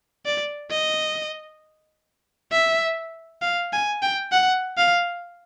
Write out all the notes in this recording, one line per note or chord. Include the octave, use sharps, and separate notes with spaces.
D5
D#5
E5
F5
G#5
G5
F#5
F5